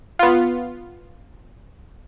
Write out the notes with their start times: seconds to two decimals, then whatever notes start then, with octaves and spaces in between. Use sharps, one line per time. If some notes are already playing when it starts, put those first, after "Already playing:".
0.19 B3 F4